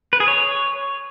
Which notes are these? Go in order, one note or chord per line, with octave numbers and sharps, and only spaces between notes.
B4
G#4
C#5